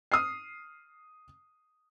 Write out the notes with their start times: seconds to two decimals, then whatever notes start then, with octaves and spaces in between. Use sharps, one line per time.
0.12 D#6 F6 C7